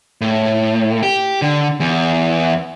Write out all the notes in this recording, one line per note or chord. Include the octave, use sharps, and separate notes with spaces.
A2
G4
D3
E2